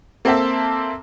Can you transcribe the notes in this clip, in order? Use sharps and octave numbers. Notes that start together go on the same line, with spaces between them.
A#3 C4 A4 C5 E5 A5